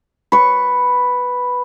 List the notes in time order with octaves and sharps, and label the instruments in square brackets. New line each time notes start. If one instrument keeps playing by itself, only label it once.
[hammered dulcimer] B4 C#6